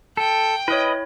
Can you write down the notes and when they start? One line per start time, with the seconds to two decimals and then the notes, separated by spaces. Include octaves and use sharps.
0.17 A4 G5
0.68 E4 B4 C#5 D#5